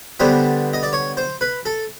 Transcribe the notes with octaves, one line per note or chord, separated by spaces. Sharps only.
D3 G3 B3 C5
D#5
D5
C#5
C5
B4
A4